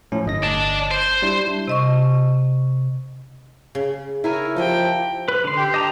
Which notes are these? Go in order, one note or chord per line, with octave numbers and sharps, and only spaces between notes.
A2 F3 C#4
G1 D#5 A#6
D5 A5
C5
G3 D4 E4
C3 D#5 C#6
C#3
E4 A#4 C#5 G#5
F3 D#4 G4 D#5 E5 G5
B4
D3 C6
G4
D#5 A5 A#5